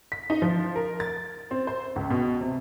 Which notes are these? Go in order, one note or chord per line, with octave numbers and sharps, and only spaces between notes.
B6
D#4
F3
A#4
A6
C4
C5
C#2
B2
C3